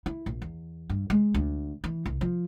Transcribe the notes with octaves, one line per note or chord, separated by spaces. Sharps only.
E4
A#1
E2
G2
G#3
D2
E3
C2
F3